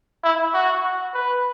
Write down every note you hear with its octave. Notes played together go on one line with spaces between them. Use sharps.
E4
F#4
B4